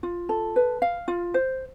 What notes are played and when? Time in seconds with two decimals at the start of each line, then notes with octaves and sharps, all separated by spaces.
0.03 F4
0.29 A4
0.56 B4
0.82 F5
1.08 F4
1.34 C5